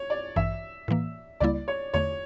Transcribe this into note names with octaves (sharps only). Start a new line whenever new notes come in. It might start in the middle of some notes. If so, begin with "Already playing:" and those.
Already playing: C#5
D5
A1 G2 E3 E5
A2 E3 A#3
C#2 C#3 G3 A#3 E4 D5
C#5
E2 D3 A3 C#5